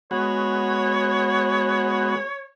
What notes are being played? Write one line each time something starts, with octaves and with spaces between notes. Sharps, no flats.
G#3 B3 F#4 C#5